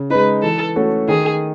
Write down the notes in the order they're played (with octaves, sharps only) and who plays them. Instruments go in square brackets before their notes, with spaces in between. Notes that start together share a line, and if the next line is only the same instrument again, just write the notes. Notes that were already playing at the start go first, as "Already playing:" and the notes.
Already playing: [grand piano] C#3
[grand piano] G#3 D#4 [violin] B4
[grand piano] E3 [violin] A4
[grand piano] A3 C#4 F#4 A4
[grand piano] D#3 [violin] G#4